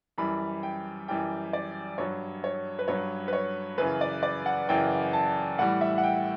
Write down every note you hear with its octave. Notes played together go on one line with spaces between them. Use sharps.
F#2 E3 G3 B5
G5
F#2 E3 G3 G5
D5
G2 F#3 C#5
C#5
B4
G2 F#3 C#5
B4
C#5
F#2 C#3 E3 B4
D5
D5
F#5
F#2 C#3 E3 G5
A5
A2 E3 G3 F#5
E5
F#5
G5